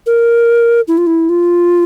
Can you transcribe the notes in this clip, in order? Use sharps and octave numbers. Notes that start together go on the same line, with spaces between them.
A#4
E4
F4
E4
F4